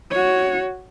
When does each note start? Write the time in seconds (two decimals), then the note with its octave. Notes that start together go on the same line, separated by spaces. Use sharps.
0.11 F#4 C#5